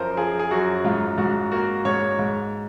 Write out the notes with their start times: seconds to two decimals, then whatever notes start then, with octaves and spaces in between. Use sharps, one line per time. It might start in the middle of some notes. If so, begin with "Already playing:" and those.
Already playing: F#2 F3 A#4 C5
0.17 F3 G#4
0.39 G#4
0.51 F#2 F#4
0.85 G#2 F4
1.18 G#2 F#4
1.52 A#3 F#4
1.85 G#2 C#5
2.19 G#2